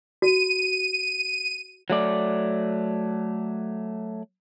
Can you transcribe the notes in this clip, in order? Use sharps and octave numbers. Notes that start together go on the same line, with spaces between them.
F#4 D#7
F#3 A3 D5